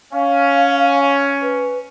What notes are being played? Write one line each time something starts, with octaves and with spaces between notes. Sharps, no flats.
C#4 F5
B4